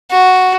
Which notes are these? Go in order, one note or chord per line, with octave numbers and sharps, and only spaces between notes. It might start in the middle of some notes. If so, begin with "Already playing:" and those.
F#4